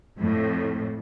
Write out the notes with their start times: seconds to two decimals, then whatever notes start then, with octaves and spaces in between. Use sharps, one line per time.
0.18 F2 A2